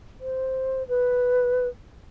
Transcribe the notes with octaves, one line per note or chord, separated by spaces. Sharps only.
C5
B4